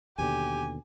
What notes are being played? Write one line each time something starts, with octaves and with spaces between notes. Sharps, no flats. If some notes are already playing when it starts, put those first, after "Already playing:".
D#2 B2 D3 G4 G#5